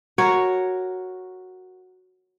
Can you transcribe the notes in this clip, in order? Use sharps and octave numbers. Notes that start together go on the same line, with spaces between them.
F#4 A#4 C#5